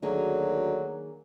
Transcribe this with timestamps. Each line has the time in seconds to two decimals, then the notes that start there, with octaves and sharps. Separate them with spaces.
0.02 D2 D#3 F#3 A#3 G#4